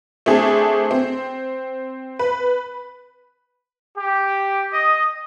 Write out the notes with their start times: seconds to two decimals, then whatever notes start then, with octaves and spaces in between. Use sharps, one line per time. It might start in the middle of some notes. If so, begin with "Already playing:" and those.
0.26 A3 C4 D4 G#4
0.91 C4
2.19 B4
3.97 G4
4.73 D#5